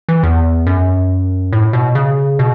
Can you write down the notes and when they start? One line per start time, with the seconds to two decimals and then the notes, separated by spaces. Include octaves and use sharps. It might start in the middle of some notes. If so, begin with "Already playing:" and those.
0.09 E3
0.23 E2
0.67 F#2
1.53 A2
1.73 B2
1.95 C#3
2.39 B2